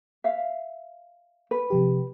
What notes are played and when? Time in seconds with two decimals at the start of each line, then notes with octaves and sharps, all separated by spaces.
0.24 E5 F5
1.51 B4
1.70 C3 F3 G4